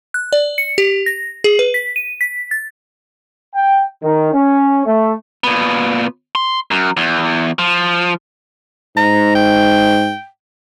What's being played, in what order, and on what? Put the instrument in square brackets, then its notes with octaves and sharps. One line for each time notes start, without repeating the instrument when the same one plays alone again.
[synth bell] F#6
D5
C#7
G4
A#6
G#4
B4
B6
D#7
B6
A6
[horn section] G5
D#3
C#4
A3
[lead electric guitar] A#2 B3
C6
F#2
E2
F3
[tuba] G#2 [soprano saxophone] A#5
[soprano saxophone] G5